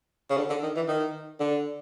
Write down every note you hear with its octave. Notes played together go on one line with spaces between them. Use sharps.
C#3
D3
D3
D#3
E3
D#3
D3